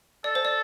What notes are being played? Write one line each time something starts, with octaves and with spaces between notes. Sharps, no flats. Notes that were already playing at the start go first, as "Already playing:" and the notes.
A4 D5
C5
D5